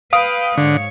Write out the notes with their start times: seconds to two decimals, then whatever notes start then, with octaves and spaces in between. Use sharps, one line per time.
0.13 B4 F5 G5 D#6 D7
0.57 G#2 D3 C#5